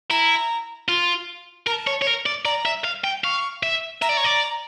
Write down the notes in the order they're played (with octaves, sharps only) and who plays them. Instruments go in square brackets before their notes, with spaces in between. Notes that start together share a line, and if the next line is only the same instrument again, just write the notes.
[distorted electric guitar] E4 [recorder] A#5
[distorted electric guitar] F4
[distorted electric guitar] A#4 [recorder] A#5
[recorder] A5
[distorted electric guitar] C#5
C#5
A#4
D5
[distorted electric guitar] D5 [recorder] A#5
[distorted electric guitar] E5
F5
G5
[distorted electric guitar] F5 [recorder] C#6
[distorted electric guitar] E5
[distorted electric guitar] E5 [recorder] A#5
[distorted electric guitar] D5
C#5
D5